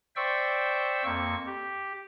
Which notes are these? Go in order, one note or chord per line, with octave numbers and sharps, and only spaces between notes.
C5 D5 E5 G5 C#6 E6
F2 A#3 C#6
G4